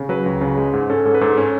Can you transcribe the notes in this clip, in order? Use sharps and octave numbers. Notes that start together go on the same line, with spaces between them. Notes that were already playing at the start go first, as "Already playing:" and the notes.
Already playing: C#3
F#3 B4
C#2
C#3
G#3
G#2
C#4 A4
G#2 A4
B4
G#2 A4
C#4